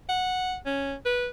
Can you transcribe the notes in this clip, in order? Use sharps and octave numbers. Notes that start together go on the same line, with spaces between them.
F#5
C#4
B4